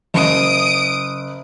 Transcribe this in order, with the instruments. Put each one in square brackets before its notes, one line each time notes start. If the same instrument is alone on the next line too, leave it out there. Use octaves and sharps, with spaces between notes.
[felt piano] F#1 [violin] D#6 D7